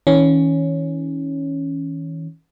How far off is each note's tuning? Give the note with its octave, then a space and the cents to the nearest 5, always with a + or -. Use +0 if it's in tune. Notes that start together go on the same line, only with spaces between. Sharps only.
E3 -45 C#4 +0